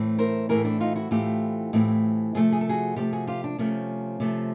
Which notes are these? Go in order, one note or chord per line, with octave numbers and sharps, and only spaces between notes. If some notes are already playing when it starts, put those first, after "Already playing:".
Already playing: A2 E3 A3 C4
A#4 C5
A2 E3 A3 C4 G#4 A#4
D4 E4
D#4 F4
E4 F#4
A2 E3 A3 C4 F4 G4
A2 E3 A3 C4
C3 F3 A3 G#4
A4
G#4
A4
F#4 G#4
C3 F3 A3 G4 A4
F#4 G#4
F4 G4
D4
C3 F3 A3 C#4
C3 F3 A3